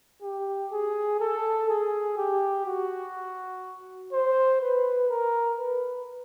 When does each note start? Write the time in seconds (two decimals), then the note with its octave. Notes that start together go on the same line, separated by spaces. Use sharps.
0.22 G4
0.72 G#4
1.20 A4
1.69 G#4
2.17 G4
2.66 F#4
4.13 C5
4.61 B4
5.10 A#4
5.59 B4